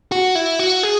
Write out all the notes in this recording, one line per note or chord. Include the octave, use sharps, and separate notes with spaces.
F#4
E4
F#4
G#4